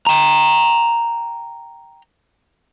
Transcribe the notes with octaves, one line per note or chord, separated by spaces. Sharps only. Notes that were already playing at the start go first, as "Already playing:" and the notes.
G5 A#5